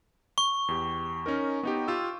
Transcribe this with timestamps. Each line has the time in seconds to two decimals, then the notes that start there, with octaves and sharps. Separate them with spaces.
0.38 C#6
0.68 E2 G4
1.26 C#4 D#4 A#4
1.63 B3 D#4 G4
1.88 F4 G4 E6